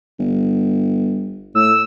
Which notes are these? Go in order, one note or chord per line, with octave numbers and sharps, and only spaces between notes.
G1
A2 E6